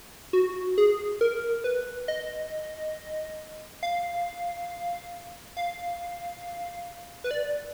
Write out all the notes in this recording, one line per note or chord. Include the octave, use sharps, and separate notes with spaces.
F#4
G#4
A#4
B4
D#5
F5
F5
B4
D5